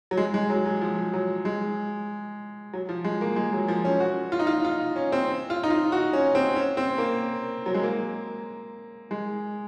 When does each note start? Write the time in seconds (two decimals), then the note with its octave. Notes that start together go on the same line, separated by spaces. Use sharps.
0.11 F#3
0.17 G#3
0.34 G#3
0.50 F#3
0.66 F#3
0.81 F3
1.14 F#3
1.45 G#3
2.73 F#3
2.89 F3
3.04 G#3
3.21 A#3
3.36 G#3
3.53 F#3
3.68 F3
3.85 C#4
4.00 F#4
4.32 F4
4.39 D#4
4.47 F4
4.65 F4
4.96 C#4
5.12 C4
5.50 F4
5.63 D#4
5.70 F4
5.92 F#4
6.13 C#4
6.35 C4
6.56 C#4
6.77 C4
6.98 A#3
7.66 F#3
7.74 G#3
7.83 A#3
9.11 G#3